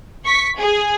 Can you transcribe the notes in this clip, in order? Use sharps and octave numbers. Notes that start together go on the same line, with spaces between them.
C#6 B6
G#4